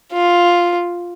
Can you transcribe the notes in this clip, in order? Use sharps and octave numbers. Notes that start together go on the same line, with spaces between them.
F4